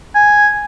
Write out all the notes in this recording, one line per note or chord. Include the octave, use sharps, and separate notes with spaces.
G#5